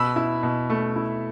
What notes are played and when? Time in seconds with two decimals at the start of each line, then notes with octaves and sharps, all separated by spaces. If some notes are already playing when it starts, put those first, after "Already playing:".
Already playing: B2 B5 E6
0.16 E4
0.43 B2
0.70 A3
0.96 E4